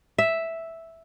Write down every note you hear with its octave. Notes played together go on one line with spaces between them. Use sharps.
E5